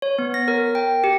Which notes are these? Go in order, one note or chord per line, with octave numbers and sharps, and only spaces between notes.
C#5
B3
A#6
A#4
G5
G4